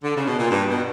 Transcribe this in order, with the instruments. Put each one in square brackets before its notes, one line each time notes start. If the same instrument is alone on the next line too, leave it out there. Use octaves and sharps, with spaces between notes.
[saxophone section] D3
C#3
B2
A#2
[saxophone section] G2 [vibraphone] D4 G4 B4
[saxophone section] B2